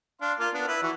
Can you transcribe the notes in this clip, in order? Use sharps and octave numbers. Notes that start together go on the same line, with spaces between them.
D4 F5 C6
A#3 F4
B3 D4
E4 B4
E3 F#4